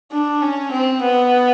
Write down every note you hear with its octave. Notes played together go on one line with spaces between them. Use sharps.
D4
C#4
C4
B3